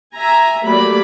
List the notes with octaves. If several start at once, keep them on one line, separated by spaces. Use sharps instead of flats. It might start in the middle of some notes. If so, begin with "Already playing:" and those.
E5 G#5 A#5
F#3 G3 A3 A#3 D5 B5